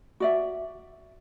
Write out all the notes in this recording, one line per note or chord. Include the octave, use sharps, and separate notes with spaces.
F#4 D5 E5